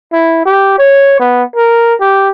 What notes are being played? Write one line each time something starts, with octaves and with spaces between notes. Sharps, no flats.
E4
G4
C#5
B3
A#4
G4